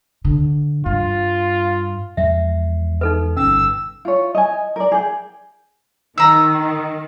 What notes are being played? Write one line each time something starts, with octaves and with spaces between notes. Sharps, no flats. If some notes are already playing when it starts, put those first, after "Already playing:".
D3
G2 F4
E2 F3 G#3 E5
D#4 A4 B4
G1 B2 C#4 E6
F4 C#5
D#5 G#5
A#4 D5
G#4 G5
D#3 A#5 E6